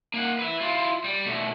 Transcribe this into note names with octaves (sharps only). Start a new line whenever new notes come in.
A#3 F#5
B4 E5
E4 F4
G3
B2 A3